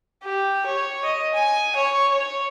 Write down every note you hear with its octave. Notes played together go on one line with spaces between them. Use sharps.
G4
C#5
D#5
G#5
C#5
C#5